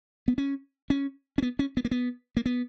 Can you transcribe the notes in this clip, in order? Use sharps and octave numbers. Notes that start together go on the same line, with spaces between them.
B3
C#4
C#4
C#4
B3
C#4
B3
A#3
B3
A#3
B3